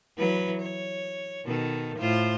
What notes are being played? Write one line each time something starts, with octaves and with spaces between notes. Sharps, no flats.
E3 F#3 B4
C#5
B2 D#3 A4
A2 F4 C5